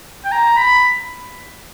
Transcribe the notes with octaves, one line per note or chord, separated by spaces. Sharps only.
G5
A#5
B5